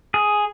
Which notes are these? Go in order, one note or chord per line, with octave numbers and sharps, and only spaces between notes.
G#4